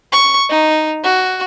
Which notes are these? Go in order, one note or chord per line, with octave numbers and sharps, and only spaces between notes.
C#6
D#4
F#4